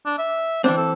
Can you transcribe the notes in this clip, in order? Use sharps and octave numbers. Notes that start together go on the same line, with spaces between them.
D4
E5
E3 C4 D4
A4